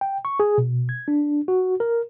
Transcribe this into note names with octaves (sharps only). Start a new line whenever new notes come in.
G5
C#6
G#4
B2
G#6
D4
F#4
A#4